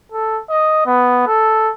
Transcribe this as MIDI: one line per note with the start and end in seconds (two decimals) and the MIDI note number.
0.12 0.38 69
0.50 0.85 75
0.86 1.23 59
1.27 1.69 69